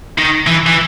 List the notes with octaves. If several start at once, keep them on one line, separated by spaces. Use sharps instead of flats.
D#3
E3
E3